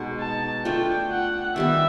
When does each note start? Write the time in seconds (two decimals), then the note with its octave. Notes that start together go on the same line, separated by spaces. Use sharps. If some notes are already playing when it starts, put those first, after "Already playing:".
Already playing: B2 G#3 B3 D#4
0.20 A5
0.65 A3 D4 F4 G5
1.11 F#5
1.56 D#3 G3 B3 E5